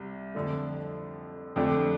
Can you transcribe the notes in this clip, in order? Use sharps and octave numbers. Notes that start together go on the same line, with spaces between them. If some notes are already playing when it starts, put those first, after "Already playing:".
Already playing: C2 C3
F2 D3 A3
F2 D3 A3 D4 G4